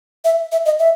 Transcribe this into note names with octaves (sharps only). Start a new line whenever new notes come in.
E5
E5
D#5
E5